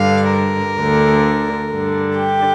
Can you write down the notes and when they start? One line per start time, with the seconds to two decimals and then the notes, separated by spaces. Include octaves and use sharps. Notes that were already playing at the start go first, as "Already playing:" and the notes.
Already playing: G2 D3 F5
0.33 A#4
0.80 D2 D3
1.72 G2 D3
2.19 G4